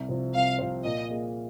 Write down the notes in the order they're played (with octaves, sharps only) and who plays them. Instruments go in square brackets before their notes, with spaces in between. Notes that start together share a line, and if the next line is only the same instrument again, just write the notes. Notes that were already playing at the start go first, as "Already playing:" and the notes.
Already playing: [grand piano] C2
C3 F3 C4
[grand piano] C2 [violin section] F5
[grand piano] C3 F3 C4
[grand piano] A#2 [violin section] D#5
[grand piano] A#3 G#4